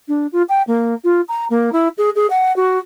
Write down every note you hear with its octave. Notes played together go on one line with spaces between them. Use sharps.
D4
F4
G5
A#3
F4
A#5
A#3
E4
G#4
G#4
F#5
F#4